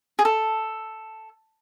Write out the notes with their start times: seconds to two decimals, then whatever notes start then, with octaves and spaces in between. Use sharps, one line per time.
0.19 G#4
0.25 A4